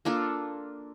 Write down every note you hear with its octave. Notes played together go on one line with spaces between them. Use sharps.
A#3 D4 F4 A4